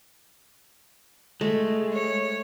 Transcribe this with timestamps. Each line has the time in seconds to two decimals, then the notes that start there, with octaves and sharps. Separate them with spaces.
1.41 G#3 A3
1.93 C#5